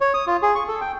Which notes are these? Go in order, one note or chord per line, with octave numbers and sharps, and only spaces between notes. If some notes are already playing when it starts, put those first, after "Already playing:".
C#5
D#6
F4
G#4
C#6
A4
G5